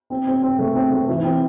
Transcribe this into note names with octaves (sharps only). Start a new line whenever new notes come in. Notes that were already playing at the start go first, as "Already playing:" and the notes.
C4
C4
C4
A3
C4
A3
E3
C4